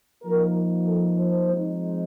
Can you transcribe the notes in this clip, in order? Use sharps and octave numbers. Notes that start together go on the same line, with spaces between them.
F3 A#3 D#4 A#4
A4
C5
F3 G#3 C4 D#4